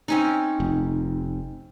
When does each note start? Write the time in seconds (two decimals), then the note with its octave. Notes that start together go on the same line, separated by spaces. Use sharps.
0.08 C4 C#4 D#4
0.60 F1